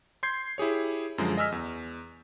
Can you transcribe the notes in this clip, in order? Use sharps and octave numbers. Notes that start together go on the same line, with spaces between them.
C6 G6 G#6 C7
E4 G4 G#4 C#5
F#2 D3 F3 G#3
D#5 G#5 E6 F6 B6
E2